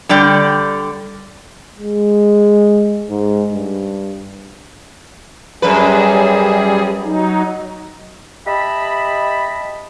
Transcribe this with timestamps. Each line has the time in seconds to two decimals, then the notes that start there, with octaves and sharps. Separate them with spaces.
0.09 D3 G3 D5 G5
1.78 G#3
3.10 G#2
3.51 G2
5.62 F#2 G3 G#4 B4
7.04 F#3 D#4
8.47 G4 D#5 E5 A5 B5